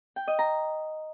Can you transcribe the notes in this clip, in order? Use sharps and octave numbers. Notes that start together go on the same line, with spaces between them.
G5
D#5
A#5